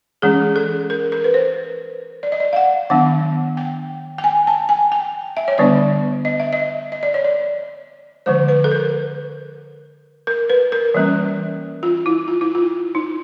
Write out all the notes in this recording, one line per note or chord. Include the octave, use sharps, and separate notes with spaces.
E3 G#3 C#4 G#4
A4
A#4
A#4
B4
C5
D5
D#5
D5
F5
F#5
D#3 F#3 B3 D4 F#5
G5
G5
G#5
A5
G#5
G5
E5
C#5
D3 G3 B3 D4 D5
D#5
E5
D#5
D#5
D5
C#5
D5
D3 F3 G#3 C5
B4
A4
A#4
A#4
B4
A#4
E3 G3 A#3 C#4
F4
E4
F4
E4
F4
D#4